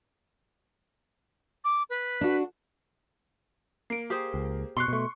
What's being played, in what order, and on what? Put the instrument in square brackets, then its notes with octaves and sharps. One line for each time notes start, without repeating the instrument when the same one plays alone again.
[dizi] D6
B4
[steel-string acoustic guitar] D4 F#4
[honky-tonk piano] A#3 [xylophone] C7 D7
[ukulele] G4 G#4 C5
[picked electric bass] C#2
[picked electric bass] B2 [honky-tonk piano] C6 C#6 [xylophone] F#6 C7 G7
[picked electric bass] B2 A3